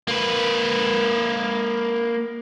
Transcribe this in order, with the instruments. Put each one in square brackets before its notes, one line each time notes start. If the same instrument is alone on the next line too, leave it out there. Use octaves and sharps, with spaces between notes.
[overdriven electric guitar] A#3 B4